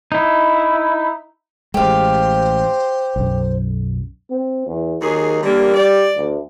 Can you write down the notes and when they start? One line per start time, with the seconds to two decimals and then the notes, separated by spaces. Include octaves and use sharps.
0.12 D#4 E4
1.74 A1 G#3 G4 C5 F5
3.16 B1 F#2
4.31 C4
4.67 E2
5.01 D#2 D#3 F#3 G#4
5.43 D3 E3 G3 A#3
5.74 D5
6.17 D2